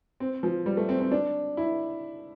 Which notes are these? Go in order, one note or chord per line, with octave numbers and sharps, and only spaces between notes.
C4
F3
G3
A3
C4
C4
D4
E4